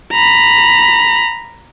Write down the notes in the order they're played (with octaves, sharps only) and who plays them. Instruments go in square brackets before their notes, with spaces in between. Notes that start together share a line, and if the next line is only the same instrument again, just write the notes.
[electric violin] A#5 B5